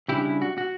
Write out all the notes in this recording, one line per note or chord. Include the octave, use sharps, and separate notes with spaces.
C#3 G3 D4 E4 G4
E4
F#4
F#4